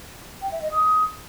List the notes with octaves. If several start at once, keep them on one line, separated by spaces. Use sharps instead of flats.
G5
E5
D#5
D#6